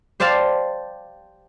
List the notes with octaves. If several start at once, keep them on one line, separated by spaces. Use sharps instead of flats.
G4 C5 D5 F5 A5